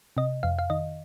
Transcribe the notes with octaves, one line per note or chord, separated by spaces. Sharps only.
C3 D#5
F2 F5
F5
D#3 D#5